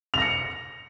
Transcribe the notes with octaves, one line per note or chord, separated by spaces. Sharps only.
A#6 C#7 F7